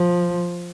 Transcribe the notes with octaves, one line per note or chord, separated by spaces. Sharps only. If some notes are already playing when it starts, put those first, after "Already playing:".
Already playing: F3